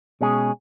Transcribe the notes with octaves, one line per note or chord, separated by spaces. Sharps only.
B2 G#3 C#4 G#4